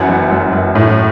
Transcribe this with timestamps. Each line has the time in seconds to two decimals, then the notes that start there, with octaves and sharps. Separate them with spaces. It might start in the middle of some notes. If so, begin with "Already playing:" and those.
Already playing: F#2 E3 F#5
0.09 F#1
0.31 F#2
0.53 F#2
0.75 A2